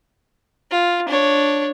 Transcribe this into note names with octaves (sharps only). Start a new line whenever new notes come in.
F4
D4 C#5